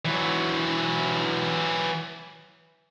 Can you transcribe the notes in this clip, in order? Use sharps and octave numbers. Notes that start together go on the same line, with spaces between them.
E3 F#3